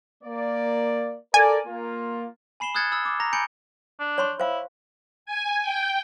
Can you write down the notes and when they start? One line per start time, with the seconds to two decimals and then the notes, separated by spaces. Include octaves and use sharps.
0.24 A#3 D5
1.34 A4 A#4 D5 G#5
1.66 A#3 F4
2.60 G#5 B5 C7 E7 G7
2.75 D#6 F6 F#6 G#6 A6 C#7
2.92 B5 D#6 E6 G#6 A6
3.05 D6 A6
3.20 A#5 A#6
3.33 G#5 B5 G6 C#7 D7 G7
4.00 D4
4.18 C#5 C6 C#6
4.40 E4 C5 F5
5.26 G#5
5.62 G5